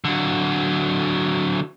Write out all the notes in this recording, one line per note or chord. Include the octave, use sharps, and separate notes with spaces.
D3 F#3